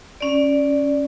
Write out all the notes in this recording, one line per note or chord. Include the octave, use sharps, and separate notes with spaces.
C#4 D5